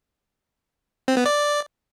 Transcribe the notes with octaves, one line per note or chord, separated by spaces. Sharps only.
C4
B3
D5